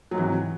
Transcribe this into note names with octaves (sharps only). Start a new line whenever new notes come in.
G#2 C3 E3 F#3